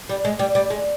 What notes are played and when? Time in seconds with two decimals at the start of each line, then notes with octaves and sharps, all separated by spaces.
0.09 G3
0.25 G#3
0.39 G3
0.55 G3
0.70 G#3